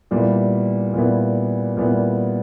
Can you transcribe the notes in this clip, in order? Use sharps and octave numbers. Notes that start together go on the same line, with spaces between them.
A#2 G3 B3 E4
A#2 G3 B3 E4
A#2 G3 B3 E4